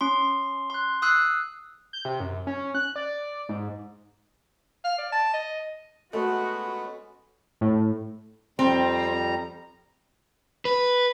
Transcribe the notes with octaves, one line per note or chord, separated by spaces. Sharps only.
C#4 C6
C6 F#6
D#6 E6 F#6 C7
G6
C3
F#2
C#4
F#6
D5
G#2
F5
D5
A5
D#5
G#3 A3 B3 C#4 F#4
A2
F2 G3 C4 A#5
B4